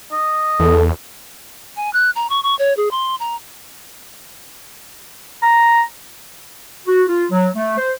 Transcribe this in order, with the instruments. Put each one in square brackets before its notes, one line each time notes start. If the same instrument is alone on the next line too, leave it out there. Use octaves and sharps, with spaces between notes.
[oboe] D#5
[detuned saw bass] E2 [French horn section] A4
[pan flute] G#5
F#6
A#5
C#6
C#6
C#5
G#4
C6
A#5
[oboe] A#5
[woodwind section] F#4
F4
F#3
A3
C5